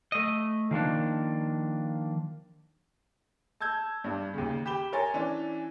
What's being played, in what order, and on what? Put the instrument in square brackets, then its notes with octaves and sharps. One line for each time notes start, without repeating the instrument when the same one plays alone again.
[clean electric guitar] A3 D#5
D#3 F3 A#3 D4
[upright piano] A5 E6 G6 G#6
G2 D4
D#2 C#3
G4 B5 E7 G7
A#4 C#5 G#5 C6 A6
E3 C#4 D4